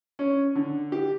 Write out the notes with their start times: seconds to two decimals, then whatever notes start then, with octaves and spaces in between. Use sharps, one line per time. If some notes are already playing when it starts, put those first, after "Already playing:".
0.19 C#4
0.55 D3
0.92 G4